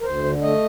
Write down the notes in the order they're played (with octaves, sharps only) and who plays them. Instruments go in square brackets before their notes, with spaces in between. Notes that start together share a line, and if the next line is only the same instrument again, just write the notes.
[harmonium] A#4
D2 C5
D3
A3 D#5